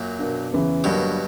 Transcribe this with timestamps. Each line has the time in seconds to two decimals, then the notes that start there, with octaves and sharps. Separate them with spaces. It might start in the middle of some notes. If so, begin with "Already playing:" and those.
Already playing: F#2 A#2
0.19 B2 A#3 D4
0.52 E2 C#3 E3
0.84 G2 B2 D3 F#3 A#3